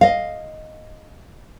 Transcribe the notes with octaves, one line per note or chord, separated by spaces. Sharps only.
D#5 F5